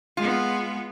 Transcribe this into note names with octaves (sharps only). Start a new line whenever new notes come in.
G#3 B3 F4